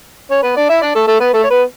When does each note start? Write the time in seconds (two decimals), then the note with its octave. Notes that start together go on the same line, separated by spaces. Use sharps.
0.30 C#4 C#5
0.43 B3 B4
0.56 D4 D5
0.69 E4 E5
0.82 D4 D5
0.95 A3 A4
1.07 A3 A4
1.20 B3 B4
1.33 A3 A4
1.44 C#5
1.50 B3 B4